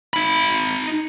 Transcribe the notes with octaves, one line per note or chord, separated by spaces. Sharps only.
D#4 B5